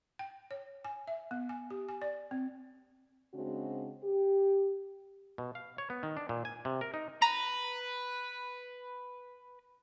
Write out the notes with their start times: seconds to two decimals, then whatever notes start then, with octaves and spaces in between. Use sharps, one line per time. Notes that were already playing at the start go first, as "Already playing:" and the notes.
0.19 G5
0.51 C#5
0.85 G#5
1.07 E5
1.31 B3
1.49 G#5
1.70 G4
1.89 G#5
2.02 D5
2.31 C4
3.34 C#3 G#3 C4 D4 F#4
4.03 G4
5.38 B2
5.55 F5
5.78 C#5
5.90 B3
6.03 D#3
6.17 D4
6.29 A#2
6.45 G#5
6.65 C3
6.81 A#4
6.94 D#4
7.22 B4 A#5